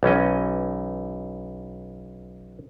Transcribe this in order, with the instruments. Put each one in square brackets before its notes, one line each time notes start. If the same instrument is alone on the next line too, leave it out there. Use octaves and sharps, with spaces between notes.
[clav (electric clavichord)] B1 E3 C#4 D#5